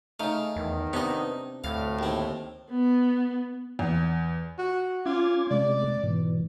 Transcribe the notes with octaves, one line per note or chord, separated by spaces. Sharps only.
C#3 A3 D#4 F5
E2 D#3
C3 B3 D4 D#4 D#5
D2 A2 F5
D#2 C4
B3
E2
F#4
C#4 F4 D6 G#6
C3 G#3 D5
G#2 B2 E3